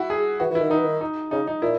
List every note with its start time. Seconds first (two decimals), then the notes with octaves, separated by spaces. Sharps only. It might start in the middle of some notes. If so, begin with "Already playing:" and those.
Already playing: E4 F#4
0.10 G#4
0.40 E3 F#4
0.50 E3
0.55 D#3 E4
0.70 D#3 D#4
0.77 E3
0.84 D#3
1.01 D#4
1.31 C#3 D#4
1.47 D#4
1.62 A#2 E4